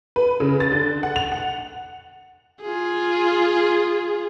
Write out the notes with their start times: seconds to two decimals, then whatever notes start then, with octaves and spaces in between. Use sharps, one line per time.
0.16 B4
0.40 C#3
0.60 A6
0.72 D3
1.03 F#5
1.16 F7
1.32 F#5
2.62 F4 G#4